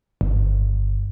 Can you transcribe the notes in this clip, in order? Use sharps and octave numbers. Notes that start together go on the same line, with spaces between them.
G1